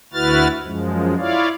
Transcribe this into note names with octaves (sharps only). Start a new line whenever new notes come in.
D2 E4 F#4 B4 F6 A6
F#2 F3 G#3
E4 F4 C#5 D5 F5